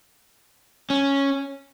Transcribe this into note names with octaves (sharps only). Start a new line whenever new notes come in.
C#4